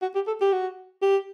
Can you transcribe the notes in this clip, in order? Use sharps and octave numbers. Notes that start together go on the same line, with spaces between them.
F#4
G4
A4
G4
F#4
G4